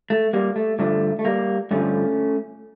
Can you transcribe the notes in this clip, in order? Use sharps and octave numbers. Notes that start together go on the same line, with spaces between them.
A3
G3 A#3
A3
G2 D3 F3 A3
A3
G3 A#3
G2 D3 F3 A3 C#4